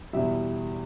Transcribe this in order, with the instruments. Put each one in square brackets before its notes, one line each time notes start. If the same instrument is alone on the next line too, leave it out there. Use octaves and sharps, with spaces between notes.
[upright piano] E2 B2 G3 E5